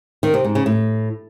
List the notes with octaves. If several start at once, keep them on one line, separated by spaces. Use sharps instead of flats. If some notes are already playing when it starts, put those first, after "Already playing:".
D#3
C3
G#2
C#3
A2